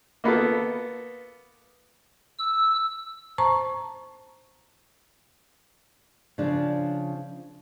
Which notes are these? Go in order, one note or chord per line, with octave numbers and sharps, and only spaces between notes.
A#3 B3 F4 A4
E6
C5 A5 A#5 C#6
C#3 F3 D4